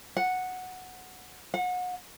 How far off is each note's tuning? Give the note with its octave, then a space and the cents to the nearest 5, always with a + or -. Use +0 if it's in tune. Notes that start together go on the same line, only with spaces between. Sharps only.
F#5 -5
F#5 -30